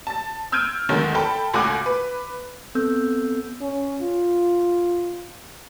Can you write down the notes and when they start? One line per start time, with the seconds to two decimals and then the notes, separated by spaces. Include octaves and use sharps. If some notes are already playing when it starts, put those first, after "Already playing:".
0.07 A5 A6
0.52 E6 F6 G6 G#6 D7 D#7
0.89 A1 E2 D3 D#3 F#3 G#3
1.15 A4 G5 A5 B5
1.54 C#2 A2 F#4 G#5 D6 F#6
1.86 B4
2.75 B3 C4 A4 E6 G6
3.62 C#4
4.02 F4